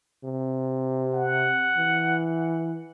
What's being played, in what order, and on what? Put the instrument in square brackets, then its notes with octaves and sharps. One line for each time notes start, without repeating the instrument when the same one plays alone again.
[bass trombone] C3
[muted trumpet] F#5
[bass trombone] E3